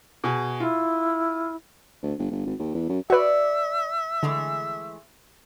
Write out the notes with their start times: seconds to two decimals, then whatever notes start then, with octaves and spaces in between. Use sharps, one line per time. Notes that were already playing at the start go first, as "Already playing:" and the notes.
0.24 B2 G#4
0.60 E4 F4
2.03 D2
2.19 G1
2.31 G1
2.46 G#1
2.59 D#2
2.75 E2
2.89 F#2
3.10 F#4 B4 C#5 D5 E5
4.23 D3 E3 G#3 A3